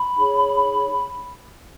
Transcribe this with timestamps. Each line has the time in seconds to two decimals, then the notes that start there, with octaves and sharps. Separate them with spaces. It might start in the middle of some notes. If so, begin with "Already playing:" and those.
Already playing: B5
0.16 D#4 G#4 C#5